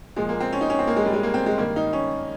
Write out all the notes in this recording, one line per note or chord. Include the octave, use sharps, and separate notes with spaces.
A#2 F3 G#3
A#3
C4
C#4
D#4
C#4
C4
A#3
G#3
G3
G#3
A#3
C4
G#3
G2 D#3 A#3
D#4
C#4